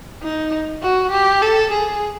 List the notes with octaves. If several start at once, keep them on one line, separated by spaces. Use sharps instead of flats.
D#4
F#4
G4
A4
G#4